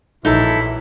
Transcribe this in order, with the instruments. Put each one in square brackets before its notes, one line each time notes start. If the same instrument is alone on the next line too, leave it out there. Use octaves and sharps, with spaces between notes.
[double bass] A#1 [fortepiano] G2 E3 F#3 [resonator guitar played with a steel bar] D#4 A4 [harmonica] E4